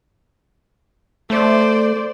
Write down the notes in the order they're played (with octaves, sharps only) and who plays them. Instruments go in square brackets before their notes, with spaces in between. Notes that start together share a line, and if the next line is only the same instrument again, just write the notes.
[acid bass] A3 [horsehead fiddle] C5 D5